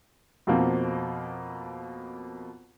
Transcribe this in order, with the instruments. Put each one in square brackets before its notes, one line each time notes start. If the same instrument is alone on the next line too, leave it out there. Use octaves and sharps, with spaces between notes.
[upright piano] F2 B2 F3 A#3 C4